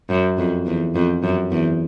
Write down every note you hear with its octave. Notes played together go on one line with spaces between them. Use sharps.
F#2
F2
E2
F2
F#2
E2